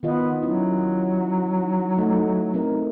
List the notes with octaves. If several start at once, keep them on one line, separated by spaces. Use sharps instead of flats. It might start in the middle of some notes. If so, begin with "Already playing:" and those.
D#3 B3 F4 D#5
F#3 C#4 E4
D#4
A3 D#4
C4 D#4 A#4